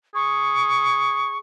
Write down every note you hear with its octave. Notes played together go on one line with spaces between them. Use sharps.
G#4 C#6